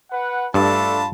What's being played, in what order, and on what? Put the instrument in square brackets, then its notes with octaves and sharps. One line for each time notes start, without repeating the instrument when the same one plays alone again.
[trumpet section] B4 F#5
[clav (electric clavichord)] G2 [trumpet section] A3 D4 A4 [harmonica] F4 A5 [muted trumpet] B5